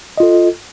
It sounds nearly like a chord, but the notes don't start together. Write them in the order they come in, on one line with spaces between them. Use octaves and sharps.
D#5 F4 A4